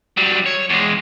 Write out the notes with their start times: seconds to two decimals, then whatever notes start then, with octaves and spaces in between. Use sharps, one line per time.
0.17 F#3 G3
0.46 C#5
0.70 E2 G#3